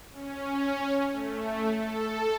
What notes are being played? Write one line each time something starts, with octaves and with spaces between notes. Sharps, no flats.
C#4
A3
A4